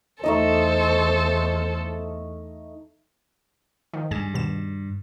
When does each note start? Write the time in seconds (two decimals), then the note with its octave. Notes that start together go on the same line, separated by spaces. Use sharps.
0.24 E2 A3 D#4 A4 C5 D#5
3.93 D#3 F3
4.11 G2 G#4 G#5 E7
4.34 D#2 B2 E7